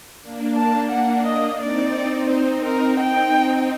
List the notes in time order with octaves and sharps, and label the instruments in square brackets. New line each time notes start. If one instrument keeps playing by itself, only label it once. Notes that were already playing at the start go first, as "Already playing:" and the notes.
[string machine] A#3 D4
[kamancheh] A5
F#5
D#5
[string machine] C4 D#4 [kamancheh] D5
[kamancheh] C5
A#4
G5